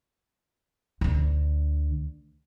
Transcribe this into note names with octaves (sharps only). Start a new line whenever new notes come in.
D2 D3